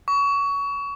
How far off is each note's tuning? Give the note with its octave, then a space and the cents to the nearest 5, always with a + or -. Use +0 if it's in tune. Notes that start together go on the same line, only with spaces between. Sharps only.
C#6 +25